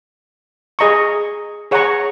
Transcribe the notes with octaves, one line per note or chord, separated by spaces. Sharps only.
G#4 D#5 A#5 C#6
G#4 C#5 F#5 A#5 C#6